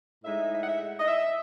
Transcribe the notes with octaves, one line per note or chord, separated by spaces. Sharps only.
A2 G#3 D#4 E5
E5
F#5
E5
D#5
E5